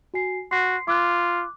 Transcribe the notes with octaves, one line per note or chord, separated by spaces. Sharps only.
F#4 G#5 C7
F#4 C6 C7
F4 D6 F#6